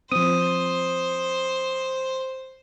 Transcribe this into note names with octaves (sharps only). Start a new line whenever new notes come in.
F3 C4 C5 D#6